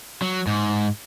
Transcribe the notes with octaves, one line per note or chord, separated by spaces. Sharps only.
F#3
G#2